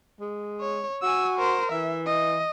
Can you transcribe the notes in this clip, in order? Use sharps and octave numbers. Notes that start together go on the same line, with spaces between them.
G#3
C#5
F#4 G#5 E6
A#4 C5
E3 E5
D#5